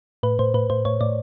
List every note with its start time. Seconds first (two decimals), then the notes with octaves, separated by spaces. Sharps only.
0.23 A2 B4
0.39 A2 C5
0.54 A2 B4
0.70 A2 C5
0.85 A2 C#5
1.01 A2 D5